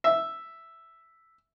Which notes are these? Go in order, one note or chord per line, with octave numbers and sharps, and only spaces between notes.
E5